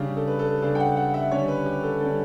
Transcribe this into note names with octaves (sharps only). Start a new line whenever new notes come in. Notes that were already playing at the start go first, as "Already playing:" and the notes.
Already playing: C#3 G3 D4 G4
A4
B4
A4
C#3 G3 D4 A4
G5
F#5
F#5
E5
D3 G3 C#4 C#5
B4
G4
A4
D3 G3 C#4 A4